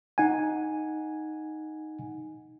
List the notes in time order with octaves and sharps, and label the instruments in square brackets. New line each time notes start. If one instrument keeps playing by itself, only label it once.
[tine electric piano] D#4 F#5 G#5